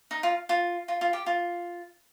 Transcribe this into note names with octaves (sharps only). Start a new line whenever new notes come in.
D#4
F4
F4
F4
F4
G4
F4